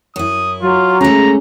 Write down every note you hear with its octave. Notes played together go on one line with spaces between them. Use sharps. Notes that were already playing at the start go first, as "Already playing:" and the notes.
F#2 E4 D#6
F#3 F4
G#3 A3 C#4 A#5